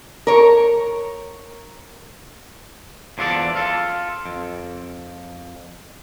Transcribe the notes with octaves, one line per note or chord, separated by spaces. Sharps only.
A#4 C#5
E2 F3 D4 A4 D5
F4 A4
F2